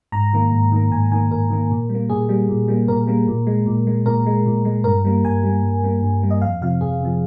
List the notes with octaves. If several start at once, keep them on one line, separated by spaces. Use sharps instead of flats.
G#2 A#5
D#3 A#3
G#2
D#3 A#3
G#2 G#5
D#3 A#3 G#5
G#2 A#4
D#3 A#3
A#2
G3
A#3
A#2 G#4
G3 A#3
A#2
G3 A#3
A#2 A#4
G3 A#3
A#2
G#3
A#2
G#3
A#2 A#4
G#3
A#2
G#3
G2 A#4
G3 A#3
G2 G#5
G3 A#3
G2
G3 A#3
G2
G3 A#3
D#5
F2 F5
C3 F3 F5
F2 G#4
C3 F3